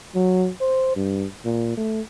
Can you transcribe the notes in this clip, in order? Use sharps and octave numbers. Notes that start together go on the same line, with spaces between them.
F#3
C5
G2
A#2
A3